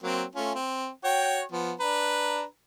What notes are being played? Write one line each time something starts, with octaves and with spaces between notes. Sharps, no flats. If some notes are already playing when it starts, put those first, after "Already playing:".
F#3 A#3 C4
A3 C#4 F4
C4
F#4 C#5 G5
F3 B3
D4 B4 A#5